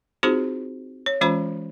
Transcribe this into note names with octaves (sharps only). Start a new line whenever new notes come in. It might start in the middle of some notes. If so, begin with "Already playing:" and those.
C4 D#4 F4 F#4 G#4 C5
C#5
E3 G#3 C#4 F4 C5 B5